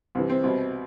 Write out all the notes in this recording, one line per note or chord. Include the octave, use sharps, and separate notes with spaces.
C2 C3 E3
C4
C2 B2